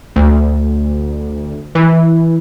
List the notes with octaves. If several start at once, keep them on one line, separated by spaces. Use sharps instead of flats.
D2
E3